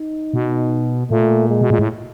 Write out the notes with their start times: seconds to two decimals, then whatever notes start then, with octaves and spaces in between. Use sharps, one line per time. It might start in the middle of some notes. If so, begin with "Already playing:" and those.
Already playing: D#4
0.34 B2
1.10 A#2 A3
1.49 G#3
1.61 B2
1.71 A#2
1.79 A2